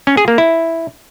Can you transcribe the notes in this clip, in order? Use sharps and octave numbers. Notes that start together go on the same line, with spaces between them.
C#4
G#4
A#3
E4